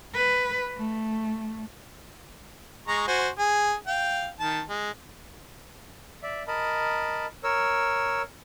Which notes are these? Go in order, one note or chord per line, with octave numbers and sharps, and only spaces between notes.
B4
A3
G#3 A#5 C#6
F#4 C5 G#5
G#4
F5 G5
D#3 A5
G#3
D5 E5
A#4 D#5 A5 B5
A#4 C#5 E6